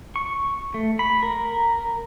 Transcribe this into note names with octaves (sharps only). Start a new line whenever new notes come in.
C#6
A3
B5
A#4